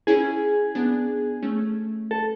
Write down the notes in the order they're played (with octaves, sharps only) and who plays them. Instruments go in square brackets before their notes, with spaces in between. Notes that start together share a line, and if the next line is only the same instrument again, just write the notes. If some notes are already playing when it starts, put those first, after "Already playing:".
[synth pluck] C#4 E4 [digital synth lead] G#4
[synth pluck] B3 D4
A3 C#4
[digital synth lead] A4